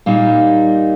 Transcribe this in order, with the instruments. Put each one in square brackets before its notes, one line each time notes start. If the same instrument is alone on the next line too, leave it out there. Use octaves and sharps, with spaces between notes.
[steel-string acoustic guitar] A#2 G3 A#3 D#4